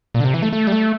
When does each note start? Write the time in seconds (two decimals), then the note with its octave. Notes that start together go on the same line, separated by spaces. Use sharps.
0.14 A#2
0.20 D3
0.24 C3
0.34 E3
0.42 A3
0.53 A3
0.67 G3
0.72 A3